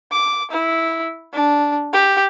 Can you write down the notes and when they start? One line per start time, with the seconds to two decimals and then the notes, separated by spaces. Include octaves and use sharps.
0.12 D6
0.51 E4
1.33 D4
1.93 G4